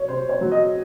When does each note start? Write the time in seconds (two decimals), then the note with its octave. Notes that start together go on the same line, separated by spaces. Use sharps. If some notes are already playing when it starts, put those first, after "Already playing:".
Already playing: F#3 C#5
0.08 C3 C5
0.29 C#5
0.41 F#3
0.52 D#5